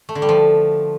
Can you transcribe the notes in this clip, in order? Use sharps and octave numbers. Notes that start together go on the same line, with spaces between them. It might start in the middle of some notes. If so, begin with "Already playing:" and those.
A3
D3
G3
F3